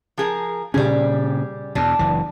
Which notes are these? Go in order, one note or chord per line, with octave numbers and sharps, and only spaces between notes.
F3 G#4 A#4
A#2 C#3 G3 C#4 G#4
E2 B2 D4
F#1 E3